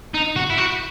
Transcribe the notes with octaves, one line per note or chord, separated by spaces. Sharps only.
D#4
F#4
E4
F#4